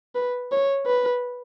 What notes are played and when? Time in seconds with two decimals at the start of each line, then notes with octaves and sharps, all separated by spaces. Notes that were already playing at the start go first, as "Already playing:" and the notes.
0.15 B4
0.52 C#5
0.86 B4